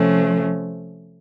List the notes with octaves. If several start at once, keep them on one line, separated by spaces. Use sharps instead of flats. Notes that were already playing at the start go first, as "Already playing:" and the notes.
Already playing: C3 F3 A3 C#4